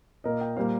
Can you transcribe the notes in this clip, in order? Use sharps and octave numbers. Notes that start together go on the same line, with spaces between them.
A#2 A#3 A#4 D#5
D#5 G5
A#2 G3 A#3 C5 F5